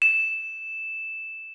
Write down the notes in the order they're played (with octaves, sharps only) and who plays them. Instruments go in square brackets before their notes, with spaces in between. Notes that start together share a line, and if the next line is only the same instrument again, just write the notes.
[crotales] E7